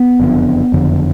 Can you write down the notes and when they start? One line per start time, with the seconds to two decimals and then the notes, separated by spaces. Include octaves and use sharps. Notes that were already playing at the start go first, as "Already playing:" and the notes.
Already playing: B3
0.20 F#1 F2 D3
0.72 F#1 F2 D3